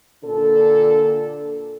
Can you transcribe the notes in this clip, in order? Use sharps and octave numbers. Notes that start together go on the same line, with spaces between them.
A#2 D3 D4 A4